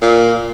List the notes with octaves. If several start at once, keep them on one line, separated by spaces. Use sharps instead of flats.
A#2